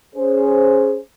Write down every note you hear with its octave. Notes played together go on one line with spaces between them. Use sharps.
C#4 G#4 C5